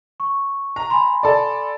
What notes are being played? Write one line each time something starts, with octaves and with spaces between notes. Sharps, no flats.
C#6
A#5
G#5 B5 C6
A4 D5